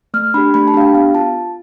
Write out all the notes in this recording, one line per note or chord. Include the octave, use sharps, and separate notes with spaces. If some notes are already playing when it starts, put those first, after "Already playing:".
A3 F6
D4 G4 B5
A3 B5
A5
D4 G4 F5
G5
B3 F5
F4 A5